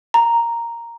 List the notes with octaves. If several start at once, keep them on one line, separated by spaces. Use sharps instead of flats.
A#5